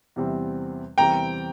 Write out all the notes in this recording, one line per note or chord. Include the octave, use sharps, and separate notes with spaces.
E2 C3 E3 G3 C4
E2 C3 E3 G3 C4 G5 A#5